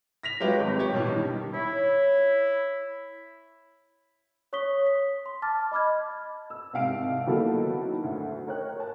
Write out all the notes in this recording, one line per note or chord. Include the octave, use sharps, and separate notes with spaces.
A#6 B6 F7
F#3 G#3 F4 G4 B4
G#1
G4 C#5
B2 E3
G2 D#3
E4 C#5
C#5 C#6 D#6 B6 G7
B6
C6
A5 D6 F6 A6
D#5 B5 D6 F6 G#6
E6
C2 G#2 F5 D7
D#3 F#3 A#3 B3 E4 A4
D2
A#4 C#5 G5 F#6
A5